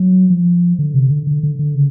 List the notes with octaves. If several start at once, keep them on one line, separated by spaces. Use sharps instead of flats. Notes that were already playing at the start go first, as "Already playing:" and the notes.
Already playing: F#3
F3
D3
C3
D3
D3
D3
D3
C#3